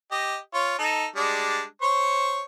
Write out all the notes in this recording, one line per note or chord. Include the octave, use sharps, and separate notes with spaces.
G4 D#5
F4 C#5
D#4 A4
G3 G#3 D4
C5 C#5 C#6